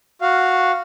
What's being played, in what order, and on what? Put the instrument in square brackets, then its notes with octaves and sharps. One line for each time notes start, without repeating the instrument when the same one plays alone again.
[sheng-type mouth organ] F#4 F5